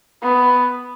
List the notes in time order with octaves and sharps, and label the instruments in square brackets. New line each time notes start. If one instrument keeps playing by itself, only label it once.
[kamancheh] B3